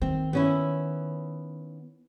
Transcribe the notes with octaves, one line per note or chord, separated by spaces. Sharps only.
D#3 C4
B3 C#4 E4